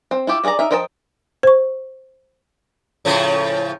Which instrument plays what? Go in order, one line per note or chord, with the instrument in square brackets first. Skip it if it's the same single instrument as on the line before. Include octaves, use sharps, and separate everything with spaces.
[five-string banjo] C4
E4 F4 G4
C#4 G#4 A4 D5 A#5
D#4 A#4 E5
F3 A#4 D#5 G5 A5
[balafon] C5 C#6
[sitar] A2 C#3 F3